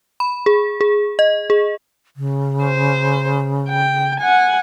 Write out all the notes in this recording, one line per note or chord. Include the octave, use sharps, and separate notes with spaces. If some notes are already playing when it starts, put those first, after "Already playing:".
B5
G#4
G#4
D#5
G#4
C#3
C5
G5
F#5 G#5